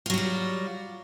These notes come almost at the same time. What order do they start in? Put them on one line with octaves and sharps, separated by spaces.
F4 F#3 F#4 G3